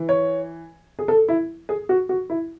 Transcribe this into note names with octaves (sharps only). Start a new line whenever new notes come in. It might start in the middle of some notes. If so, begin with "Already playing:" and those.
Already playing: E3
C#5
G#4
A4
E4
G#4
F#4
F#4
E4